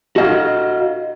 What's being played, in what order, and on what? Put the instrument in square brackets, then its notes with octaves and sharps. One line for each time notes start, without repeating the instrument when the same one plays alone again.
[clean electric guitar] F#4 D#5 F5